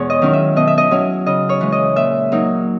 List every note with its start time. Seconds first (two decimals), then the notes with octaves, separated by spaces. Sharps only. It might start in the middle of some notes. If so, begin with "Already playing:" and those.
Already playing: E2 B2 G#3 B3 C#5
0.10 D#5
0.22 D#3 F#3 C#4 E4
0.33 E5
0.56 B2 D#5
0.67 E5
0.78 D#5
0.91 F#3 C#4 E4
1.26 C#3 D#5
1.49 C#5
1.61 E3 G#3
1.72 D#5
1.96 A#2 E5
2.32 F#3 A#3 D#4